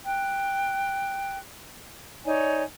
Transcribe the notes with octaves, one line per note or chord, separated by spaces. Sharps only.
G5 F#6
D#4 C#5 D5 G#5